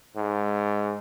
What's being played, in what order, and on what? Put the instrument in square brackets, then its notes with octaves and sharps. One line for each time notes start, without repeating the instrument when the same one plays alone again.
[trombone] G#2